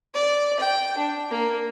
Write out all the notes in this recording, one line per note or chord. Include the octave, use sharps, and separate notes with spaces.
D5
G5
D4
A#3